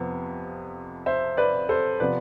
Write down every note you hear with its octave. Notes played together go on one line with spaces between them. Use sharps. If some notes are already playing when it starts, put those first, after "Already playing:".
Already playing: F2 C3 F3 B3
C5 E5
B4 D5
A4 C5
C3 F3 B3 B4 D5